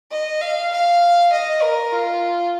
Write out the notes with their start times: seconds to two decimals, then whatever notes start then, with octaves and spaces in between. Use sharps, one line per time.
0.11 D#5
0.41 F5
0.72 F5
1.33 D#5
1.62 A#4
1.93 F4